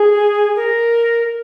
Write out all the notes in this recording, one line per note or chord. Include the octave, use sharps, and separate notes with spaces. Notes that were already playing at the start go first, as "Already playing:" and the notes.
Already playing: G#4
A#4